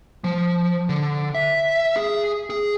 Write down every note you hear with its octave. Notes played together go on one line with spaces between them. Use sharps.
F3
D3
E5
G#4
G#4